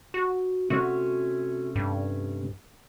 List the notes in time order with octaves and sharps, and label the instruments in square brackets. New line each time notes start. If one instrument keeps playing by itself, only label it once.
[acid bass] F#4
[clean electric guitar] C3 A3 C#4 [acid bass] F#4
[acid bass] G2